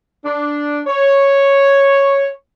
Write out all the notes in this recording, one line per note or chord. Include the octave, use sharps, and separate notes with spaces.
D4
C#5